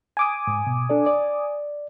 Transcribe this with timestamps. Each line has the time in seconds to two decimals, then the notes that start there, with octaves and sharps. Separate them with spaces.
0.17 G#5 D6 D#6
0.47 G#2
0.67 B2
0.90 D4 A4 D5
1.06 D5